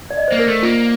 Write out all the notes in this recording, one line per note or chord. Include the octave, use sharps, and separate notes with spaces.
D5
D#5
A#3 C5
A#4
A3
A#3 F4